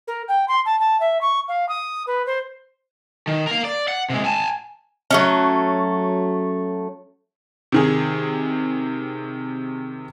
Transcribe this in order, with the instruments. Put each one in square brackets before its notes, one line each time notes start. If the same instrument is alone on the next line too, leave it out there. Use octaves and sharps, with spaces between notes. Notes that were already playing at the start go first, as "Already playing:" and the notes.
[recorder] A#4
G5
C6
A5
A5
E5
C#6
F5
D#6
B4
C5
[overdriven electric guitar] D#3
A#4 F5
D5
F#5
C3 G#3
G#5 A5
[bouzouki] F#3 A3 C#4
[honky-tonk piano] C3 D#3 G#4